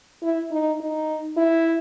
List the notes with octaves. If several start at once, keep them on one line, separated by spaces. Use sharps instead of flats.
E4
D#4
D#4
E4